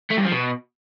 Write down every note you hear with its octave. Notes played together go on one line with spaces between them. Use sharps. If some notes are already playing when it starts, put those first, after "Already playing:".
A3
G2
F3
B2